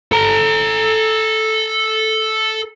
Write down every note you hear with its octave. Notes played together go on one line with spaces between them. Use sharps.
A4 A#5